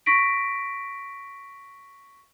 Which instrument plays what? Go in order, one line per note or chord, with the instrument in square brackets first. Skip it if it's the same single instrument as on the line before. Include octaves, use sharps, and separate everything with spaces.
[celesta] C#6 A#6 B6 D7